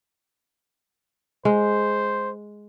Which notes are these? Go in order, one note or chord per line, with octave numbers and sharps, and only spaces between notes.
G#3 C5